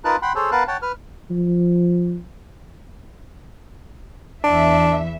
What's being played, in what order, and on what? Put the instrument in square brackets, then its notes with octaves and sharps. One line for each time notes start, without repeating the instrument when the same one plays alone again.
[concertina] D#4 F4 A#4 B4 A5 F#6
F#5 G5 B5 C6
G#4 A4 C5 C#5
B3 A#4 B4 F5 A5 F#6
C#5 F#5 G5 A5
B4 F6
[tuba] F3
[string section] E2 E3 E5 [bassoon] D4